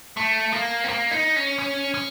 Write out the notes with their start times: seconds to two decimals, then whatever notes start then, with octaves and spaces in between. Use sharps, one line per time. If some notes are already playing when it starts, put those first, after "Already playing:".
0.17 A3
0.53 A#3
0.84 C4
0.89 A#3
1.11 D#4
1.36 C#4
1.59 C#4
1.94 C#4